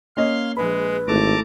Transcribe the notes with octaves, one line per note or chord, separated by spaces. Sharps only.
A#3 C#4 D#5 F5 C6
A#1 G#3 B4 B5
G#1 A3 E4 A5 A#5 D6